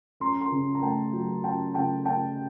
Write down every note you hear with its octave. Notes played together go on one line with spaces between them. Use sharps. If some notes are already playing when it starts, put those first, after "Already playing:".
C#4 A#5 C6
A#5 C6
C#3
A#5
A3 G5 A5
F#3
C#4 G5 A5
C#3 G5 A5
C#4 G5 A5